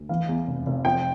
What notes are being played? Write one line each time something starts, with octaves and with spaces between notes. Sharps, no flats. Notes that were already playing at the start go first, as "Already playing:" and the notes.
Already playing: D2
E3 F5
E2
F1
F1
F3 G5